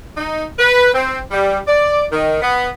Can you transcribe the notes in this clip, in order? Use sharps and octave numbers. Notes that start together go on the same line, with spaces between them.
D#4
B4
C4
G3
D5
D#3
B3